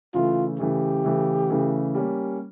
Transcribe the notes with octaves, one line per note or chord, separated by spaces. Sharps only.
C#3 E3 A3 F4
C#3 E3 A3 G4
C#3 E3 A3
C#3 E3 A3
G3 A#3 C#4